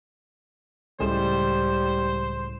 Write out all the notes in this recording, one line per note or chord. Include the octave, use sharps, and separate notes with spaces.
C#2 A2 G3 G#3 C5 E7